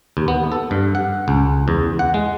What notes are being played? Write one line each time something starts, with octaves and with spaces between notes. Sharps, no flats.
D#2
B3
A4
G2
F#5
C#2
E2
F#5
G#3